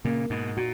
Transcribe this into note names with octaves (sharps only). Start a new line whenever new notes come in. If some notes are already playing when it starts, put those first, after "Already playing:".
A#2 C#3 A#3
G#2 B2 D#4
A#2 F#4